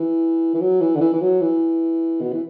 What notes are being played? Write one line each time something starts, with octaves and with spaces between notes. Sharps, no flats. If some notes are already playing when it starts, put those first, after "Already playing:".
Already playing: E3
E3
F#3
E3
D3
E3
E3
F#3
E3
B2
E3